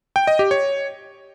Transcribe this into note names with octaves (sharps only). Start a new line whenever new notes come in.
G5
D#5
G4
C#5